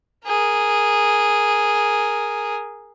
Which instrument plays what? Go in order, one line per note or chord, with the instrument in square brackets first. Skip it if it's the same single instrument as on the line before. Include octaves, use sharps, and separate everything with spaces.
[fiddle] G#4 A#4